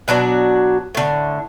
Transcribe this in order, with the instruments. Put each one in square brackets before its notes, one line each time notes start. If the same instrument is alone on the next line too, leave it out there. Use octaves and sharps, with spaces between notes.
[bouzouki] B2 F#3 D4 F#4
A2 D3